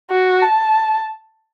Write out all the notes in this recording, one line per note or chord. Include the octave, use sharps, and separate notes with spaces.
F#4
A5